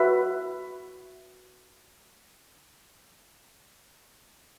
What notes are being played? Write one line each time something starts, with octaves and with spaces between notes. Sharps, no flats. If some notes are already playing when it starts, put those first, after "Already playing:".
Already playing: F#4 B4 E5